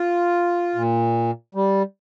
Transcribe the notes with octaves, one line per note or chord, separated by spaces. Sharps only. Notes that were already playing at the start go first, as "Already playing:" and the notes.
Already playing: F4
A#2
G3